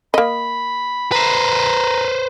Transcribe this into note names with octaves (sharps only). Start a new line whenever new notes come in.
A#3 D#5 B5
B4 C5 A#5